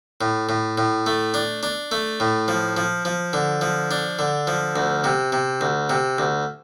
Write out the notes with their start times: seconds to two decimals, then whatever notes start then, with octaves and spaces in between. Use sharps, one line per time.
0.21 A2
0.49 A2
0.78 A2
1.06 A3
1.34 D4
1.63 D4
1.92 A3
2.20 A2
2.48 F3
2.77 F3
3.05 F3
3.33 D3
3.61 F3
3.91 D4
4.19 D3
4.47 F3
4.76 D2
5.04 C3
5.32 C3
5.61 D2
5.90 C3
6.18 D2